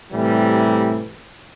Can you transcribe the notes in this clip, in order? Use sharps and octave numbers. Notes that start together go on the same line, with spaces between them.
A2 C3 E3 G3